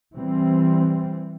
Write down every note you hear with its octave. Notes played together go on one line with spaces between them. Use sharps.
E3 G3 C4